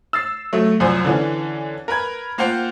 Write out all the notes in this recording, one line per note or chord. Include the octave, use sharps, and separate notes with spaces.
E6 A6 C7
F#3 A3
C2 F#2 F3 C5 G#5
D3 E3 C#4
A#4 B4 B5 G#6
A#3 F4 C5 F#5 G5